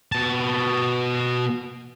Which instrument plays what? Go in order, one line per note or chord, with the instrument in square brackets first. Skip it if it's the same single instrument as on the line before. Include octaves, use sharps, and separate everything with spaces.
[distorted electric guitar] B2 A5